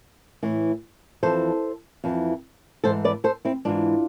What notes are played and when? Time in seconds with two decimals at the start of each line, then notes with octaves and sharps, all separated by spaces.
0.43 A2 E3
1.23 F2 E3 A4 C5
2.04 F2 E3
2.84 G#2 E3 A4 C5
3.05 B4 D5
3.24 A4 C5
3.45 C4 E4
3.65 G#2 E3 D4 F4